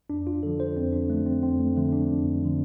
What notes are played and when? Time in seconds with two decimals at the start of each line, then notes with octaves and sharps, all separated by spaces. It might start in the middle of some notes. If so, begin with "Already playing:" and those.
0.09 F2 D4
0.27 F4
0.43 D3 F3 A4
0.60 C5
0.76 F2 C4
0.93 D4
1.10 D3 F3 A3
1.26 C4
1.43 F2 C4
1.60 A3
1.76 D3 F3 A3
1.93 D4
2.10 F2
2.43 D3 F3